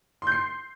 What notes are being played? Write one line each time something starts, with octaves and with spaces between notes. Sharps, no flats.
C6 G6 C7